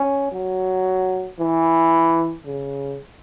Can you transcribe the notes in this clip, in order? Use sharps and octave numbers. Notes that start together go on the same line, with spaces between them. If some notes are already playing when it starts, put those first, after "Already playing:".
Already playing: C#4
F#3
E3
C#3